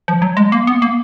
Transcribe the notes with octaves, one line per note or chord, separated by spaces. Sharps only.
F3
F#3
G#3
A#3
B3
A#3